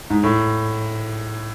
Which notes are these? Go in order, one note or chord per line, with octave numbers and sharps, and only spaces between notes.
G#2
A2